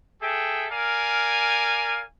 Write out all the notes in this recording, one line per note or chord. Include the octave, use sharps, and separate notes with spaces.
G#4 A4 E5 G5
A#4 D5 F5 G#5